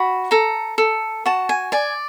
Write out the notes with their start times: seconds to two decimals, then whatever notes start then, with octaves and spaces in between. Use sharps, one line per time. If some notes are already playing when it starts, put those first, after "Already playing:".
Already playing: F#4 B5
0.31 A4 A#5
0.78 A4
1.26 F#4 A5
1.49 G#5
1.72 D5 G#5